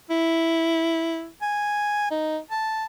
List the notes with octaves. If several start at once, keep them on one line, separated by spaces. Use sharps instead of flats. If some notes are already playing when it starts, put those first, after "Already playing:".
E4
G#5
D#4
A5